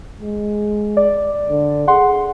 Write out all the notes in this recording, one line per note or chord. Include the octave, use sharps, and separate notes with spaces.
G#3
D5
D3
G#4 F#5 C6